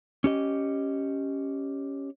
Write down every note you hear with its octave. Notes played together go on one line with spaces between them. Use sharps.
C#4 G4 D#5